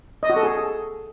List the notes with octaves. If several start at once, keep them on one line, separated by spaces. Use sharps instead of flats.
D#5
F#4
A4
G#4